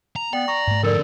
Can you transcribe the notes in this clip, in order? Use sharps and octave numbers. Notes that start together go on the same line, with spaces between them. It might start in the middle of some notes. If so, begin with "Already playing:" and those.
A#5
B3 D5 G5
A#5 C#6
G#2 A3
F2 D3 A4 A#4 D5